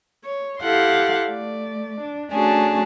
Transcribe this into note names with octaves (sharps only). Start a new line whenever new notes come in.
C#5
E4 G4 A4 F5 F#5 C6
A3 D5
D4
A3 C#4 D4 F#4 G#4 A5